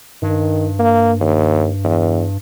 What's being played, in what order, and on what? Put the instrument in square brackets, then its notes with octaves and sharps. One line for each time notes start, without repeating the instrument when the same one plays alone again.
[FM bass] G2 [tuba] D#3
[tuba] A#3
D#2
E2